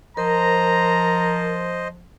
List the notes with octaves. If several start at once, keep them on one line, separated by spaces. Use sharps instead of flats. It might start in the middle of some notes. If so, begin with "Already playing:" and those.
F3 A#4 C5 D#5 A#5